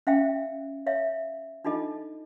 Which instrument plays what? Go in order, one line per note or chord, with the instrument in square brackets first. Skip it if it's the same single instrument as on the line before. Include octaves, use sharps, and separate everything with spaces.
[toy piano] C#4 E5 F5 G5
C#5 E5 F5
D4 D#4 F4 A4 D#5